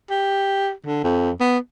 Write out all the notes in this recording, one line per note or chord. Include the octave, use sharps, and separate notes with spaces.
G4
D3
F2
B3